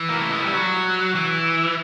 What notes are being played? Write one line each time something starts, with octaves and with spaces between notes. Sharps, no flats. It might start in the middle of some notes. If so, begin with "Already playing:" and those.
Already playing: E3
A#3
A3
G#3
G3
F#3
E3